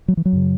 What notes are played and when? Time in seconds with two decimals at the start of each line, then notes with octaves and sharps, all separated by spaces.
0.08 F#3
0.17 E3
0.25 F#3
0.33 F#2 C#3